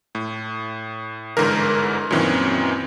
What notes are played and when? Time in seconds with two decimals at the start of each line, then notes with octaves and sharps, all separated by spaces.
0.15 A2
1.37 G1 G#2 D3 E3 A#4
2.11 F#2 A#2 D#3 E3 C4 C#4